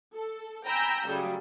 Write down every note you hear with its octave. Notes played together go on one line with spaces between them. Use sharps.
A4
G5 G#5 A#5 B5 E6 G6
C#3 F#3 G3 A3